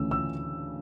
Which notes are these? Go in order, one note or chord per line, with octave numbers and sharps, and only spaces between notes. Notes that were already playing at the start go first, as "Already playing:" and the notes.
Already playing: D2 C#3 E3 A3 C#4 E6
E6